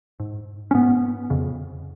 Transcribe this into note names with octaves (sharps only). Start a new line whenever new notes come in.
G#2
C#4
G#2 B3
F2 C#3